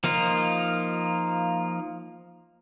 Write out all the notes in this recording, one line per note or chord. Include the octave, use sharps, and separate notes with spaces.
F3 A#3 D#4 F4